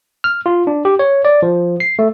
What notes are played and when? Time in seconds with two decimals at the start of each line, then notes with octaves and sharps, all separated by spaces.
0.24 F6
0.46 F4
0.67 D4
0.85 G4
0.99 C#5
1.25 D5
1.42 F3
1.80 C7
1.99 A3